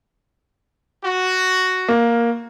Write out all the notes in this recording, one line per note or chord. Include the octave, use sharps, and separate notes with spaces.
F#4
A#3